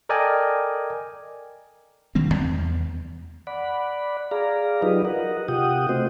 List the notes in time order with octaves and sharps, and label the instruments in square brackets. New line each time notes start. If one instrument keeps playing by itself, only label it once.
[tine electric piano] A4 A#4 D5 D#5 G5 G#5
[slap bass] E1 D#3 G3 C4
E2
[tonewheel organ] D5 F#5 B5
G#4 D5 F5 A#5
F#3 D#4 F4 G4 B4 D#5
A#4 D#5 F#5
C3 F4 G4 F#5 G5 D#6
A3 C4 F#4 C5 D#5